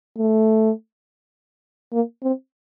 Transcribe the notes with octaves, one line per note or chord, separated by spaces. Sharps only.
A3
A#3
C4